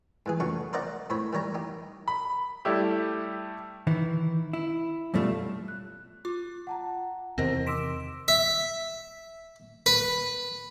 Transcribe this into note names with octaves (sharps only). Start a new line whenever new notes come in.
G#2 E3 G#4
F2 C#3 F#3 A3 C#6
A#4 C5 D5 D#5 F#5 A#5
A2 C5 C#5 B5
D#3 G3 C#5 A#5
D#4 G4
B5
G3 A3 E4 G4
D#3 E3 E4
E4
F#2 B2 G3 A3 F4 E5
F#6
F4 D6
F#5 A5 A#5
E2 C3 D#3 C4 A#4 C5 D#5 A#6
C6 D6 E6 B6 D7 E7
E5
B4